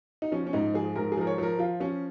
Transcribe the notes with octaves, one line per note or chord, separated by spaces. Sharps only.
D#4
F3 C#4
C#4
G#2 D#4
F3 G#4
G#2 A#4
G#4
F3 A#4
C#5
F3 A#4
F3 F4
F3 C#4